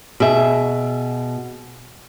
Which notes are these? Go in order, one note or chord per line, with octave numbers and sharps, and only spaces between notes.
B2 G#4 E5